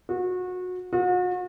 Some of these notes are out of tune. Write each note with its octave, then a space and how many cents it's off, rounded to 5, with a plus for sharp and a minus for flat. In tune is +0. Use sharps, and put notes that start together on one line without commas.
F#4 -25
F#4 -40